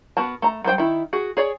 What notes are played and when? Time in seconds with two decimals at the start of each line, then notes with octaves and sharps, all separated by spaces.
0.17 B3 F#4 A#4 A5
0.42 A3 A#5
0.64 F#3 G3 C5 G5
0.78 D#3 E4
1.13 F#4 G#4
1.37 G#4 C#5 D5